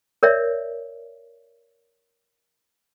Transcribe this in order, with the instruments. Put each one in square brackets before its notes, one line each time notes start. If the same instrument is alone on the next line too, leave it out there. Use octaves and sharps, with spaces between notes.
[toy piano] A#4 C#5 D5 E5